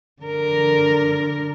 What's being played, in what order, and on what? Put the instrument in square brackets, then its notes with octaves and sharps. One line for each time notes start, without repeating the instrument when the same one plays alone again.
[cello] D3 A#4